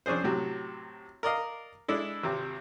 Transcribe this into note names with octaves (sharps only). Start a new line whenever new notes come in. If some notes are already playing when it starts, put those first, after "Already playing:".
F2 C#4 D4 G#4 C5
A2 C3 F#3
A#4 D5 D#5 F5
G#3 D4 E4 A4
G#1 C3